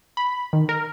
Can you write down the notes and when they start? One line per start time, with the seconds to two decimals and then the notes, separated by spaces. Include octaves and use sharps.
0.17 B5
0.53 D#3
0.69 A#4